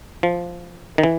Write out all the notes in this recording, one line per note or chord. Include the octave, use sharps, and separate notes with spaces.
F3
D#3
E3